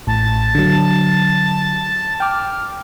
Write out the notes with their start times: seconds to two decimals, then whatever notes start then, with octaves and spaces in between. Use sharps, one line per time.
0.07 A1 A2 A5
0.55 D3 F#3
2.20 G5 D6 F6